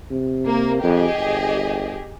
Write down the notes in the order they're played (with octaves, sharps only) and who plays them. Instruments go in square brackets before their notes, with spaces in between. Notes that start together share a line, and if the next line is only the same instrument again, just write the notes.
[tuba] C3
[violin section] A#3
[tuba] F2 [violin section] G4 G#4 D#5
[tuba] G1